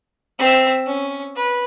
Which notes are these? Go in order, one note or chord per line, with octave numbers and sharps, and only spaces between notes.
C4 E5
C#4
B4